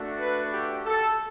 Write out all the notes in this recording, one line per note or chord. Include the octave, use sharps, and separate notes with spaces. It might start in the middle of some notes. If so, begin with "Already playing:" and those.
Already playing: A3 D4 F#4
B4
G4
A4